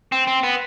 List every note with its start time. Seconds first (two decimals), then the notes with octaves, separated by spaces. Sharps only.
0.12 C4
0.27 C4
0.43 B3